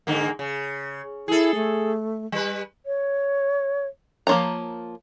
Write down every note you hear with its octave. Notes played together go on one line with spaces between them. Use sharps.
G#2 D3 A#3
C#3
E4 G#4 A4
A3
G3 B4
C#5
F3 A#3 F4 C#5 A#5